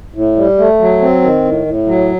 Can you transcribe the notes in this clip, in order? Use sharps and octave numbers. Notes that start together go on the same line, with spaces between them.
A2
G3
A3
F#3
C4
D#3
A2
A2
F#3